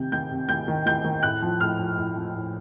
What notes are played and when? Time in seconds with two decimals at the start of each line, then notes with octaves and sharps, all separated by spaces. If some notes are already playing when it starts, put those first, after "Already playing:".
Already playing: C3 D#3 G6
0.12 D#3 G6
0.31 C3
0.49 D#3 G6
0.68 D#3
0.86 D#3 G6
1.04 D#3
1.23 A2 F#6
1.42 F3
1.60 A2 F6
1.79 F3
1.98 A2
2.16 F3
2.34 A2